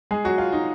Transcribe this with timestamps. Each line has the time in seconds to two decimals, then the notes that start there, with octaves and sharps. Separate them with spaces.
0.11 G#3 G#4
0.24 F#3 F#4
0.38 F4
0.52 D#4